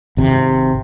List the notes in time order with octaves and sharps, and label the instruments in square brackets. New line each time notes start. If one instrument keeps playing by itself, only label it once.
[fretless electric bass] G#1 C3